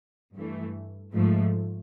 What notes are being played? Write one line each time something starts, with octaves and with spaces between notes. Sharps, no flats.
G2 E3 A3
G#2 F3 A3